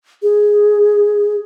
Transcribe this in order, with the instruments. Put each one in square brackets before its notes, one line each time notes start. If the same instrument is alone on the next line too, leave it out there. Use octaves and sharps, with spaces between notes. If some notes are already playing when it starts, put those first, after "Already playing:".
[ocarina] G#4